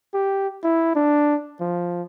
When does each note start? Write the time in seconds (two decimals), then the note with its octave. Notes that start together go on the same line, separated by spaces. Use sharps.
0.14 G4
0.64 E4
0.95 D4
1.61 F3